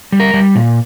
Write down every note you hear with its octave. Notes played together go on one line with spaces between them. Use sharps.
G3
A#4
G3
A#2